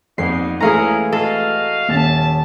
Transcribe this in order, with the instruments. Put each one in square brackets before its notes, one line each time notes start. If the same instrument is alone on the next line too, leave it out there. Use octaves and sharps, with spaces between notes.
[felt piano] F2 [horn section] G3 B3 D#4 [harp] C7
[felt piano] E3 G#3 A3 [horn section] C#4 E4 [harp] G#4 F5 A#5
[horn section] F#4 D#5 F5 [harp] A4
[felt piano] D#1 C#4 [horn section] E5 A5